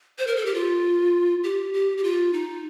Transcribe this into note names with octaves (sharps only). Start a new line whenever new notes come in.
C5
A#4
A4
G4
F4
G4
G4
G4
F4
D#4